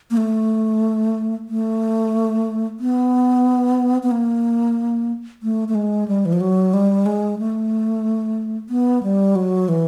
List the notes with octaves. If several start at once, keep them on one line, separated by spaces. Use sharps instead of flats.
A#3
A3
A3
B3
B3
A#3
A3
A3
G#3
G3
E3
F3
F#3
G3
G#3
A3
B3
G3
F#3
E3